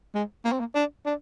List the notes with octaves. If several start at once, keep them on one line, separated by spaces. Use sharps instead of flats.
G#3
A#3
C4
A#3
D4
D4